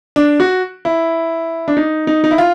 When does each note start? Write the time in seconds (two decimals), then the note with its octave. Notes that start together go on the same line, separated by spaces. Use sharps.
0.16 D4
0.40 F#4
0.85 E4
1.68 D4
1.77 D#4
2.07 D#4
2.24 D#4
2.31 E4
2.38 F4